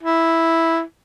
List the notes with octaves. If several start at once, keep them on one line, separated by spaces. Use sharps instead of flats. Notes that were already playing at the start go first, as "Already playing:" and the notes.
E4